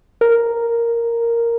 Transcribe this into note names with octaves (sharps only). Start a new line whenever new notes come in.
A#4